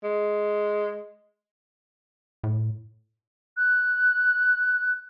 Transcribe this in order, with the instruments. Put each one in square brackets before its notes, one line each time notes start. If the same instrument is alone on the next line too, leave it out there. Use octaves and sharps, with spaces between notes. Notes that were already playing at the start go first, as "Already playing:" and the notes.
[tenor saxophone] G#3
[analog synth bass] A2
[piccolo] F#6